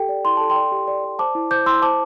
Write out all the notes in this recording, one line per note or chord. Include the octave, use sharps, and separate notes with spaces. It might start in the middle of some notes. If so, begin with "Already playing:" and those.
Already playing: G4 A4 G5
D5
E4 C6
A4 A5
G5 C6
D5
G4
D5
D5
C5 A5 D6
E4
C5 D6 G6
E4 C6 E6
C5 A5 D6